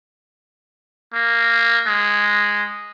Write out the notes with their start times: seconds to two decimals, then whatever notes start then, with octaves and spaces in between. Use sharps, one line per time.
1.14 A#3
1.87 G#3